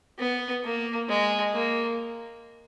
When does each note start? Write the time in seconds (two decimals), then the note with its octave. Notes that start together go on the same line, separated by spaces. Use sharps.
0.19 B3
0.64 A#3
1.09 G#3
1.54 A#3